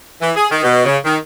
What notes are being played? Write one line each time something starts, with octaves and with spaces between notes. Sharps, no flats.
E3
G#4
D#3
B2
C#3
D#3